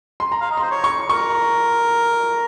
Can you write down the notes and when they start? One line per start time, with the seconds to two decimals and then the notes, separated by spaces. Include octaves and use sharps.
0.20 C6
0.32 A#5
0.40 F5
0.51 D#5
0.57 C6
0.63 C5
0.71 C#5
0.84 C#6
1.09 A#4 C#6